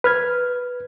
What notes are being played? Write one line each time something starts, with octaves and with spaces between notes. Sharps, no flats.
B4 F6 G#6